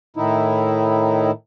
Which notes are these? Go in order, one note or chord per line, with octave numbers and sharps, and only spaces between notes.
A2 D#3 D#4 E4